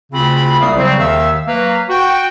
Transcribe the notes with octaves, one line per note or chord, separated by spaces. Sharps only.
D2 C#3 C4 F4 B5
C2 A#3 D5 E5 F5 D#6
C#3 F#3 G3 C4
D#2 D#3 E5 F5 E6
F#3 A#3 B4 F5 A#5
F#4 G5